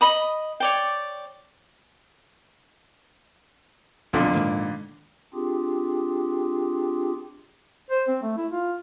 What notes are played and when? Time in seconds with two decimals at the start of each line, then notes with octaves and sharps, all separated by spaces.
0.01 D#5 B5 D#6
0.60 C#5 D5 G5
4.13 D#1 B1 F2 A#2 D3
4.35 G#2 D#3 A#3
5.34 C4 D4 F4 G4 G#4
7.90 C5
8.08 C4
8.22 A3
8.37 E4
8.51 F4